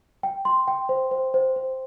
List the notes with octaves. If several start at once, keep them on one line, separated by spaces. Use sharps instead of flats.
G5
C6
G5
C5
C5
C5
C5